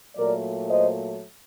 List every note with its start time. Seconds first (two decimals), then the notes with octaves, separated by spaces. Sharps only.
0.15 A#2 F#3 A3 A#4 D5
0.70 C5 D#5